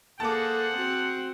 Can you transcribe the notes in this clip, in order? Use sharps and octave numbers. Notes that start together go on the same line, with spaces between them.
A#3 G#4 A4 C5 F#5 A5 D6
C4 F#4